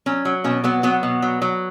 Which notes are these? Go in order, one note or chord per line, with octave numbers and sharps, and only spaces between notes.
F#3 C#4
F#3
B2 C#4
F#3 B3
F#3 B3
B2
F#3
F#3